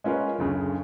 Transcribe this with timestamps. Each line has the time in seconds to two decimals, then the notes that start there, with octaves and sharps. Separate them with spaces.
0.04 G#3 C#4 F4 A#4 B4
0.39 F#1 D2 C#3